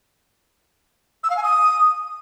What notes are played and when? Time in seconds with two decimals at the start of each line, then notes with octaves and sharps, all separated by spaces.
1.24 E6
1.30 F5
1.37 G#5
1.43 D#6